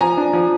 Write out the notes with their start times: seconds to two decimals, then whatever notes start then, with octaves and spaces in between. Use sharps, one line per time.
0.01 F3 G#5 A#5
0.17 D4
0.33 F3